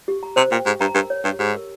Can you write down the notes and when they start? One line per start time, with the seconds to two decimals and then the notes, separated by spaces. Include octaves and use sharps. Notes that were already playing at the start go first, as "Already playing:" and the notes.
0.08 G4
0.23 A#5
0.36 C3 C5
0.52 A#2 G5
0.65 G#2 G4
0.81 G2 A#5
0.95 G2 A#4
1.10 C#5
1.25 G2 G4
1.39 G#2 G4
1.55 A#4